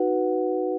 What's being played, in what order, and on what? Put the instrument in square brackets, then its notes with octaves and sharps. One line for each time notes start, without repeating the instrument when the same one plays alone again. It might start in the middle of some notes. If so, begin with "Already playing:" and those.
Already playing: [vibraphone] D#4 F#4 B4 F#5